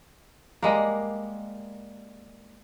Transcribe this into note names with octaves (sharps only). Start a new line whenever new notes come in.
G3 G#3 A#3